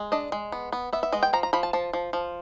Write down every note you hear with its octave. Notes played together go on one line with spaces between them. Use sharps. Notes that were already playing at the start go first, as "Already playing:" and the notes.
Already playing: G#3
D4 D#5
G#3
B3
B3
B3 E5
E5
G#3 D#5
G5
F3 A#5
A#5
F3 B5
A5
F3 A5
F3
F3